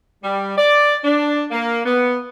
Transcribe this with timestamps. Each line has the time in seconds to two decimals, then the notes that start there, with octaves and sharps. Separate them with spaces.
0.23 G3
0.58 D5
1.04 D4
1.51 A#3
1.85 B3